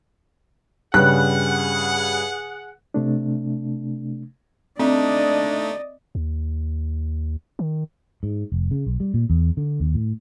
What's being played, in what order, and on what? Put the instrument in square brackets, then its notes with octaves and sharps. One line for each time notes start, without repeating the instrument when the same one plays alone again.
[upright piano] G2 C#3 G3 [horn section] G#4 F#5 [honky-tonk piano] F#6
[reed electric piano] C3 A3 D4
[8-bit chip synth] A3 D#4 [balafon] C4 [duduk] D4 [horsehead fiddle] D5 D#5
[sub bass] D#2
D#3
[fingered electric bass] G#2
F1
C#3
B1
G3
A#2
E2
D3
D#2
A2